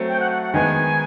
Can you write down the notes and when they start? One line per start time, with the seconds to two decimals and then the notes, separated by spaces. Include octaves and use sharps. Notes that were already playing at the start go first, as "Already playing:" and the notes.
Already playing: F#3 A3 C4
0.09 G5
0.20 F#5
0.32 F#5
0.42 F#5
0.53 D#3 G#3 B3 G#5